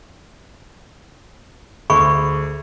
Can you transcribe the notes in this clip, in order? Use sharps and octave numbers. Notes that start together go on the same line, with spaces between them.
D2 G#4 B5 C#6